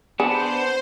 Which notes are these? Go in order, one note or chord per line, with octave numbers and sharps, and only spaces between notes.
B3 D4 G#4 C5